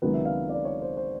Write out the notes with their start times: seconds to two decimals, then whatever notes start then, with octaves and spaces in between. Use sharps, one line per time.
0.02 C#2 C3 D#3 F#3 B3 B4
0.14 E5
0.25 F5
0.49 D5
0.65 C#5
0.82 C5
0.97 C5